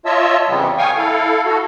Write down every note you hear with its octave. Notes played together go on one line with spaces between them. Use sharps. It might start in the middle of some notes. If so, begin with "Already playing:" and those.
F4 C#5 D#5 E5 A5 E6
F2 C#3 E3 G3 B3 C4
F5 G5 G#5 C#6 D#6
E4 A4 F5
F#4 A4